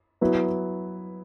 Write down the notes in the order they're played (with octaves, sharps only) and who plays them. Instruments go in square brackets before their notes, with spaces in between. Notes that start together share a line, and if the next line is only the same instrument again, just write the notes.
[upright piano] F#3 B3 E4 B4